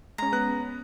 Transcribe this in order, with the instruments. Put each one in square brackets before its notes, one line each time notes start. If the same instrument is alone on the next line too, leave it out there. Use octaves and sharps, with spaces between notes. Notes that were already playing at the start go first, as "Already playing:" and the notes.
[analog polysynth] G#3 C#4 [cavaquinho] A#5
[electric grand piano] B3 B4 F#6